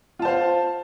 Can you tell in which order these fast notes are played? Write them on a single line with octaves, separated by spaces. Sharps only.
F4 A5 C5 F5